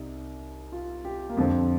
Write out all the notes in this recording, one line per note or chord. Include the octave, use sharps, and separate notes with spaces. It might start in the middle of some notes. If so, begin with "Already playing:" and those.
Already playing: C2 C3 D#4
F4
G4
A#3
F2 D3 F3 C4